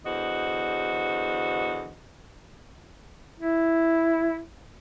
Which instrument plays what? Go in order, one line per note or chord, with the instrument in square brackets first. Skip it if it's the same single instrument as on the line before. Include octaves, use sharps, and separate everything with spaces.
[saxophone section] E2 D3 F#4 C5 D#5
[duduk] E4